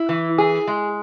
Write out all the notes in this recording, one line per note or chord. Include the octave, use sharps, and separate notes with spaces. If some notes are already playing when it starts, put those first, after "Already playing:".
Already playing: E4
E3
G#4
G#3